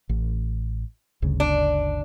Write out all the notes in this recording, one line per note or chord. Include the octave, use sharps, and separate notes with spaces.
A1
G1 D2 C#3
D4